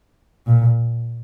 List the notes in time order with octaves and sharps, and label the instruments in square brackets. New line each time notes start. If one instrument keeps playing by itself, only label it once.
[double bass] A#2